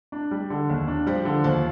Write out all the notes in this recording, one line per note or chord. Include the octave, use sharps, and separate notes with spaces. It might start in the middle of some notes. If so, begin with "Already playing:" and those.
D4
G3
D3
D#2
D4
F3 G3
D3
D#2 F3